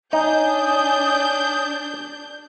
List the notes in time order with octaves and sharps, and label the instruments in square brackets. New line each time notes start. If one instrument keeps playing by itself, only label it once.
[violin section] D4 G6 [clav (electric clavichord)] D#4 [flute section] C#5 G#5 D#6